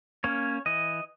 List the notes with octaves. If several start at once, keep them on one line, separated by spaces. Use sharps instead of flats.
A#3 C#4 C#5
E3 D#5